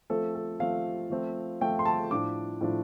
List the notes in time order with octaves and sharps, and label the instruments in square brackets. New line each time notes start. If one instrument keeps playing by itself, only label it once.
[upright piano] F3 A3 C4 A4
A4
F3 A3 C4 F5
F3 A3 C4
F3 A3 C4 G5
C6
A5
A2 F3 D4 D6
A2 F3 D4